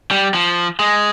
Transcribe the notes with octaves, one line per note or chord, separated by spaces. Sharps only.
G3
F3
G#3